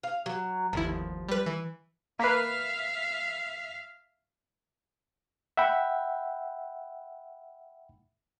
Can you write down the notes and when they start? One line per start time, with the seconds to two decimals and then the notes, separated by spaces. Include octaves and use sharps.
0.03 F5
0.26 F#3
0.73 G1 D#2 F3 E4
1.29 G3 B4
1.46 E3
2.19 A#3 B4 E5 F5
5.57 E5 F#5 G5 B5